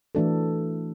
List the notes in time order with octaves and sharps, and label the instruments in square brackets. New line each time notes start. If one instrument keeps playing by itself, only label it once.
[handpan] E3 A3 D4 F#4 A4